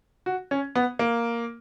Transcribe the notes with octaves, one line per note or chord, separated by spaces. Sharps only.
F#4
C#4
B3
A#3